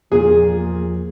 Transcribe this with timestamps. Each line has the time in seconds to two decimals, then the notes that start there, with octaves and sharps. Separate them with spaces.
0.12 E2 A#2 F3 A#3 G#4